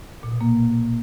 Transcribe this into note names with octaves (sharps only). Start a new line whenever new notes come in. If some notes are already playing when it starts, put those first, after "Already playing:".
A#2
B2
A#3